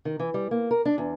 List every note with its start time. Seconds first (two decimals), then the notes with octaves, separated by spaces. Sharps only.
0.05 D#3
0.20 E3
0.34 G3
0.51 A#3
0.71 A#4
0.85 D4
0.98 E2